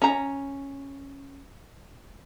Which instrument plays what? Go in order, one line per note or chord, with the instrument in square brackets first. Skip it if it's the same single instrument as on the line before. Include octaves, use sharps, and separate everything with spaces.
[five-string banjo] C#4 A#5